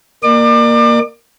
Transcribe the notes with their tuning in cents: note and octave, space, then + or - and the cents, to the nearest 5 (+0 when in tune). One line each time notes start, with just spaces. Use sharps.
A#3 +0 D5 +35 D6 +30